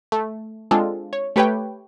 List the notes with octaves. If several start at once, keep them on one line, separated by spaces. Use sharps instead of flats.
A3
G#3 C4 D4 F4 A4
C#5
A3 G4 B4 C#5 G5